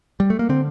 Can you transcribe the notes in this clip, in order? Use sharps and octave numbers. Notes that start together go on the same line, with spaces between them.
G3
A3
A#3
D3 C4